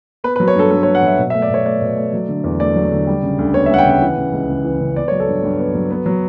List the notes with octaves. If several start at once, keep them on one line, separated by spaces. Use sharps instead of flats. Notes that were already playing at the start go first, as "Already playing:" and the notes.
B3 B4
B4
F#3
C#5
G2 A4
G2 A4
C#5
B3
F#5
F#3 E5
B2
E5
A3
D5
B2 C#5
A3 D5
B2
A3
F#3
D3
E2
A3 D5
F#3
D3
G3
C#3
D2
B3 C#5
E5
G3 F#5
G5
C#3 F#5
E3
C#3
C#2
C#2
E3
C#3
B3 D5
C#5
F#3
A4
G2
G2
B3
F#3
B3
F#3